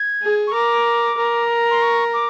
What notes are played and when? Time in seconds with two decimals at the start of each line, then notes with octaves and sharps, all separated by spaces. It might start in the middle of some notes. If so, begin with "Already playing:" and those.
Already playing: G#6
0.22 G#4
0.47 C#6
0.54 A#4 D6
1.18 A#4
1.71 C6
1.82 C#6
2.13 D6